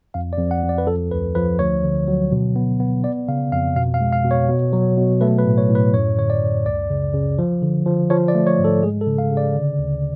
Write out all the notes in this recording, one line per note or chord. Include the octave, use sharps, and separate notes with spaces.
F2 F5
D5
F2
F#5
F2
D5
B4
F3 A4
D2 B4
F3 B4
D2 C#5
D3
F#3
B2
B3
B3
B3 D5
C#3 F5
F2 F5
B2 F5
F5
G#3
F5
B2
C#5
B2
F#3
B2
A3 B4
B4
A2
C#5
A2
B4
F#2 C#5
D3 C#5
D5
F#2
C#2 D5
C#3
C#3
F3
D3
F3
F3 C#5
D5
A3
C#5
G#2
A4
G#3 G#4
A4
C#3
F5
C#3
D5
D3
D2